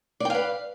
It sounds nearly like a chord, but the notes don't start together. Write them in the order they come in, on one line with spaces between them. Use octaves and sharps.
D5 G5 F5 B4